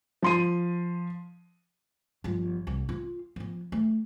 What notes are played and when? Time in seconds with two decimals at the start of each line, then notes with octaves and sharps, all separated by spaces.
0.22 F3 C6 D#7
2.24 G1 F3
2.67 C2
2.89 F4
3.36 F3 B3
3.72 A3